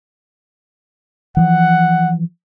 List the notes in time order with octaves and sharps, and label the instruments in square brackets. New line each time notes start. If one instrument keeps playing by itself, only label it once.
[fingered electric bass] E3 F3 [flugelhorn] F#5